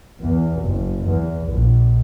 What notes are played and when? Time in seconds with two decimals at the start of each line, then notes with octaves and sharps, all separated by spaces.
0.20 E2
0.64 F#1
1.05 E2
1.50 A#1